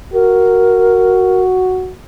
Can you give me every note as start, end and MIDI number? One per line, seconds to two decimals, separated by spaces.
0.13 1.93 66
0.13 1.43 70